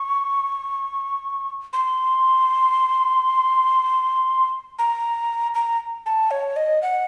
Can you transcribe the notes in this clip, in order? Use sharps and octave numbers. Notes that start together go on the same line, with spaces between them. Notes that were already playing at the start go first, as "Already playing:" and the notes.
Already playing: C#6
C6
A#5
A#5
A5
C#5
D#5
F#5